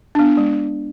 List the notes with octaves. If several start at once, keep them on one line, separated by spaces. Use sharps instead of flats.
B3 D4
G#3